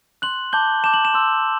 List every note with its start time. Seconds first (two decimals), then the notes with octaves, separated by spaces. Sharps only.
0.22 C6 F#6 F#7
0.53 A5 D6 G6 G7
0.84 A5 D6 G6 E7
0.94 F#7
1.05 E7
1.14 C6 E6 G6